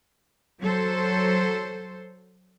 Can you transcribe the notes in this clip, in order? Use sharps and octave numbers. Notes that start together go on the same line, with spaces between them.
F#3 A4 C5